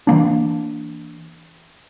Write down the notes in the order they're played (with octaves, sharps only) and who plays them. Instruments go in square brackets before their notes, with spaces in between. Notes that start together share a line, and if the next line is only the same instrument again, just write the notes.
[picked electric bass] E3 F#3 A#3 D4